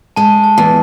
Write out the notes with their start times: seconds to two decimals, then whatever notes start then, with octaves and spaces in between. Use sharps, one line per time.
0.16 G#3 A5
0.44 A5
0.58 E2